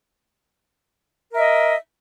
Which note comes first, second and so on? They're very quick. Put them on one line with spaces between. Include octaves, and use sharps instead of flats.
A#4 E5 D#5